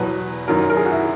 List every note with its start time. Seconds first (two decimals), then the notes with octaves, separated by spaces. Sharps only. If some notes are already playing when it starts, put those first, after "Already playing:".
Already playing: E2 B2 F#3 B4
0.48 F#2 D#3 F#3 A#4
0.70 A#4
0.77 G#4
0.86 F#4
0.91 E4